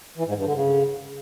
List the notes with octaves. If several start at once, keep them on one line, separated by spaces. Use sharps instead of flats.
E3
G#2
G2
D3
C#3